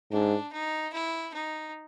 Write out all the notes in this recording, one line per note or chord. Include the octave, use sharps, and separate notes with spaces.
G#2 D4
D#4
E4
D#4